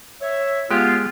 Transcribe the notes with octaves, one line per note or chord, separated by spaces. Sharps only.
C#5 E5
G#3 B3 F4 G4